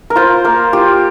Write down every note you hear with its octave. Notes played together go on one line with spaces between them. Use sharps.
A#4
F4 C5
A#3 A#4
F4 G4